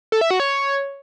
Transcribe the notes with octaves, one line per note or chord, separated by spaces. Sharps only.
A4
E5
F#4
C#5